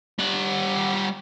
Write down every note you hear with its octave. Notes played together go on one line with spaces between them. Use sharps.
G3 F#5